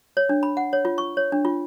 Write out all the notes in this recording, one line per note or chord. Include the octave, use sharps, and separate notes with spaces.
C#5
D4
B5
F#5
C#5
F4
C#6
C#5
D4
F4